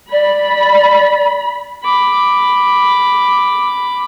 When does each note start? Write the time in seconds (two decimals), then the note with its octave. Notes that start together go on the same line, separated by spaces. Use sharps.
0.12 D5 B5
1.84 B5 D6